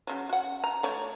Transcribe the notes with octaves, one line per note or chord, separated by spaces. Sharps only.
C#3 F#3
F#4 F#5
A#5
A3 C#5